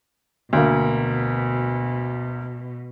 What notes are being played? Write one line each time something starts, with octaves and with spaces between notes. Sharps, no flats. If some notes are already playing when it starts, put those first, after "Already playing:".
D2 B2 A#3